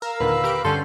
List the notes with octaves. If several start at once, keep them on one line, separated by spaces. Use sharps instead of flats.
A#4 F5 E6
D#2 A#2 D3 B4
G4 A#4 D7
G2 D3 C#4 A4 C6 G6